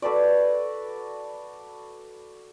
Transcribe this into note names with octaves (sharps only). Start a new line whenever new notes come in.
F#4 A4 B4 D5